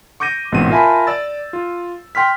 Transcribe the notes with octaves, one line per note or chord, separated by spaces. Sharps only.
C#6 D6 G6 A#6 D#7
A1 G#2 B2 A#3 C4 D#7
F4 A#4 E5 G#5 A5 B5
D5 E6 A6
F4
G5 C6 F6 B6